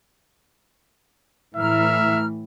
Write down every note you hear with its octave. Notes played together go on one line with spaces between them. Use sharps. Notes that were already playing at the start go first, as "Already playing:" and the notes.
A2 E3 E5 A#5 F6